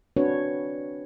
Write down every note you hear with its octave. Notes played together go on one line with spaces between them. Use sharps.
C4 D4 F#4 B4 C#5